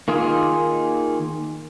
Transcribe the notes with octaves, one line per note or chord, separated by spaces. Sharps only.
D#3 A#3 F4 G#4